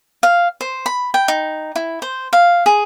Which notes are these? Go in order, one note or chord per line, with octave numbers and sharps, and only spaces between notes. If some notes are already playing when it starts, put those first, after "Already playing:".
F5
C5
B5
G5
D#4
E4
C5
F5
G#4